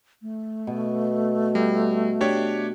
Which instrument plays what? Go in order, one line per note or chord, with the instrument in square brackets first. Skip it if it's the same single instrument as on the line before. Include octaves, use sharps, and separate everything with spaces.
[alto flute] A3
[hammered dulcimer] B2
[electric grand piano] G3
D4 G4 C#5